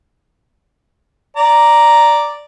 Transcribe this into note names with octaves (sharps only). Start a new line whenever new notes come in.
D5 A#5